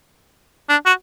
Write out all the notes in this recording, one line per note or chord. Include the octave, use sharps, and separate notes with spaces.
D4
F#4